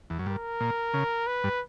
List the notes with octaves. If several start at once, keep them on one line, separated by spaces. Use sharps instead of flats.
E2
F#2
G2 A#4
A#2
C#3
B4
G2